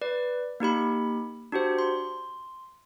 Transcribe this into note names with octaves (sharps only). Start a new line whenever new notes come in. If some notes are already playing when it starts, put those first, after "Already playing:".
B4 D5
A#3 D#4 G4 B5
D4 F#4 G4 C5
C6